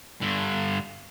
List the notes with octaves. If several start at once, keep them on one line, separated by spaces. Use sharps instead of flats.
G2 D3